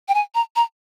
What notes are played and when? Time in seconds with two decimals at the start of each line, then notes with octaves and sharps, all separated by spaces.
0.08 G5
0.14 G#5
0.35 A#5
0.56 A#5